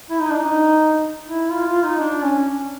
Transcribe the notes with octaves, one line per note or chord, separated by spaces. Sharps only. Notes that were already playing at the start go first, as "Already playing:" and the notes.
E4
D#4
D4
D#4
E4
F4
F4
D#4
D4
C#4